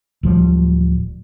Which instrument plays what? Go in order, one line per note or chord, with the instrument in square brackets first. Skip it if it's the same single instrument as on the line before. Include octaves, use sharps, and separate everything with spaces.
[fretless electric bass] D1 F3 G3